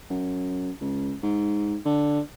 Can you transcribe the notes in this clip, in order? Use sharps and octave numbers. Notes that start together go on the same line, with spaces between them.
F#2
C#2
G#2
D3